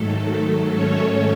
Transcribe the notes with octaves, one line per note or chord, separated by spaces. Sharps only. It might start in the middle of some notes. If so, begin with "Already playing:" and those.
Already playing: G#2 D#3 F#3 A3 A4
A3 A4
C#4 C#5